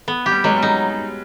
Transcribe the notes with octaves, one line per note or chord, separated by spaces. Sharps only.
B3
G4
G3
F#3 G#3
G3
D#4